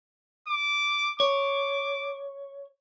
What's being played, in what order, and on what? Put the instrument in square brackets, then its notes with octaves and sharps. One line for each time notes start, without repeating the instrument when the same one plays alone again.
[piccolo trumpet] D6
[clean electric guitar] C#5 [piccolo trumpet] D6